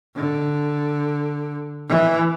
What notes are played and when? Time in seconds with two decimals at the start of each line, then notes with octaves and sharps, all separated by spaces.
0.16 D3
1.89 E3